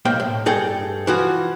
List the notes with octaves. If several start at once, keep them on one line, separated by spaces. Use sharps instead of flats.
B1 A#3 C5 G5
A2
G2 G#4 A4 G5
E3 F3 F#4